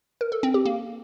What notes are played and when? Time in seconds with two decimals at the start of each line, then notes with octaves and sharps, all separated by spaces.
0.21 A#4
0.32 A4
0.43 C4
0.54 G4
0.65 A#3